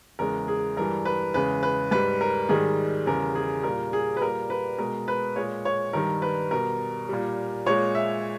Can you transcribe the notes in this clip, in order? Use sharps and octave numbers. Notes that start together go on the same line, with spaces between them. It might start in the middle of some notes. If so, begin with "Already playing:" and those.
E2 C#3 G#3 A#4
G#4
G2 E3 G3 A#4
B4
E2 C#3 G#3 B4
B4
G#2 G3 B4
A#4
G#2 D#3 G3 G#4
E2 C#3 G3 A#4
G#4
A#2 G3 A#4
G#4
B4
A#2 G3 A#4
B4
B2 G#3 A#4
B4
A#2 G#3 C#5
C#5
G2 D#3 G3 A#4
B4
B2 G3 A#4
A#2 G3
A#2 G#3 C#5
E5